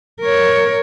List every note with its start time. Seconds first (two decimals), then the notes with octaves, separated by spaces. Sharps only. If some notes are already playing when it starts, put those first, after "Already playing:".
0.21 A#4 C#5